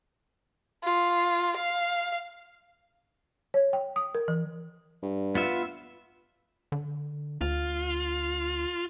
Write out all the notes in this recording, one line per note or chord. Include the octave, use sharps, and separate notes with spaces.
F4
F5
C#5
G5
D#6
A#4
E3
G2
B3 F4 E5
D3
D2 F4